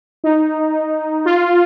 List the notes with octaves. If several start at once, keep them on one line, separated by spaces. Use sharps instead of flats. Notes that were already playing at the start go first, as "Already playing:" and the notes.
D#4
F4